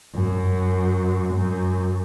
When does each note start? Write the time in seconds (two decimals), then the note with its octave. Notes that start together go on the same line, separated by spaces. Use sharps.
0.15 F#2
1.34 F#2